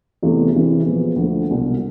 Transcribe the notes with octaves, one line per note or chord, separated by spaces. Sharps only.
E2 C3 E3 A3
C3 E3 G#3
A#2 F3 G#3 B3
D2 D3 F3 A#3
C2 B2 F#3 A#3 D4